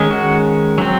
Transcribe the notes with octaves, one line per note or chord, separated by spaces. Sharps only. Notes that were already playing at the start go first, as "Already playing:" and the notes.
Already playing: D#3 G#3 C#4
F#4
F#3 C4